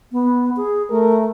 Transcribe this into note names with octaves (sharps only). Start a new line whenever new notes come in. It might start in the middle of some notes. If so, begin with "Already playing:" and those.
B3
G#4
A3 A#4